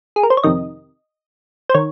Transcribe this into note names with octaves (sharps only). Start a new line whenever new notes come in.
G#4
A#4
C5
C#5
F2 C3 D#3 D#5
C5
D#3 C#5